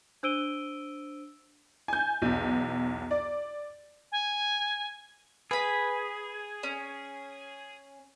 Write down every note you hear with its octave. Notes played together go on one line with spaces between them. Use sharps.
D4 C5 E6 D7 D#7 G7
G#5 G6
B1 E2
D5
G#5
G#4 B4 B5
C#4